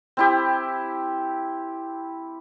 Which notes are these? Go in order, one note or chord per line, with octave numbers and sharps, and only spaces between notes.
C4 E4 G4